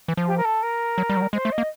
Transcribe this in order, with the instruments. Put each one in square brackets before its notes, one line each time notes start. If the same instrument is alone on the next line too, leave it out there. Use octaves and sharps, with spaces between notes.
[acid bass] E3
F3
[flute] G4
A#4
A4
A#4
[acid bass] F#3
G3
F#3
G3
[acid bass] G#3 [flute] C5
[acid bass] A3
[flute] D#5
[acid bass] A#3